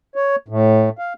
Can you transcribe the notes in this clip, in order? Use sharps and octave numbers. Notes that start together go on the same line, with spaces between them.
C#5
A2
F5